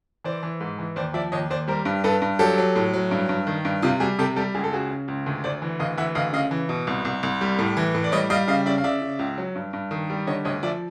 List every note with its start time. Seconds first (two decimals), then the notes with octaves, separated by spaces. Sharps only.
0.24 E3 C5 D5
0.43 E3
0.60 G#2
0.79 E3
0.96 D#2 C5 D5
1.14 F3 D5 E5
1.32 D#2 C#5 D#5
1.50 D#2 C5 D5
1.68 G3 A#4 C5
1.85 G2
2.04 G2 A4 B4
2.22 G2
2.39 F#3 G4 A4
2.58 F#3
2.76 A2
2.94 F#3
3.11 G2
3.29 G2
3.47 D#3
3.65 G2
3.82 C3 F4 G4
4.00 G3 F#4 G#4
4.19 C3 G4 A4
4.36 G3 G4 A4
4.54 C#2 G#4
4.64 A4
4.72 C#3 F#4 G#4
4.90 C#3
5.08 C#2
5.26 D2
5.44 D2 C5 D5
5.62 E3
5.79 D2 D#5 F5
5.98 E3 E5 F#5
6.15 D2 D#5 F5
6.33 C#3 D#5 F5
6.51 E3
6.69 B2
6.87 C2
7.05 C2
7.23 C2
7.41 G3
7.59 A2
7.77 E3
7.94 A2
8.04 D5
8.12 G3 C#5 D#5
8.30 G3 D#5 F5
8.48 C#3 D#5 F5
8.66 C#3 D5 E5
8.78 F5
8.84 C#3 D5 E5
9.02 C#3
9.19 C#2
9.38 F#3
9.55 G2
9.73 G2
9.91 D#3
10.10 G3
10.27 D3 C#5 D#5
10.45 D2 C#5 D#5
10.63 F3 D5 E5